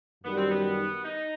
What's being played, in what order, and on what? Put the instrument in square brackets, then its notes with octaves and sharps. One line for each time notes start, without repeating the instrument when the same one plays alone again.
[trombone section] F#2 D#3 G3 [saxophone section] B3
[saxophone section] C4
B3
D#4